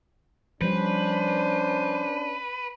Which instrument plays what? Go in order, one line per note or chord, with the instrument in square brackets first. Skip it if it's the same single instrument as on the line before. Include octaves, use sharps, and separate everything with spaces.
[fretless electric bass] F3 G3 [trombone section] C#4 D4 [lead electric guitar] B4 [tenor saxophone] C5